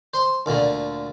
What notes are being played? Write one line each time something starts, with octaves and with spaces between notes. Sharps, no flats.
C5 C6
D2 A#2 D3 A3